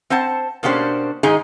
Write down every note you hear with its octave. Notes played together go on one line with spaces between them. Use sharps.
C4 C5 F#5 A5
B2 A#3 C#4 D4 G4 C5
G#2 D#3 D#4 G#4 D#5